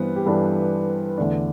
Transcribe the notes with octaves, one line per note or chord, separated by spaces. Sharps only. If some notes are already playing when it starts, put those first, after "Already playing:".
Already playing: G2 E3 B3 B4 C5
G4
G2 E3 B3 D4 A4
E2 D3 A3 D4